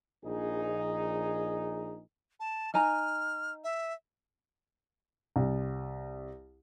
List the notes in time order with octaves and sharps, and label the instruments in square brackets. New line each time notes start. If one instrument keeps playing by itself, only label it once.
[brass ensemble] A#1 D#4 G#4
[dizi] A5
[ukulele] D#4 G#5 A#5 [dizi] F6
[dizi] E5
[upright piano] C2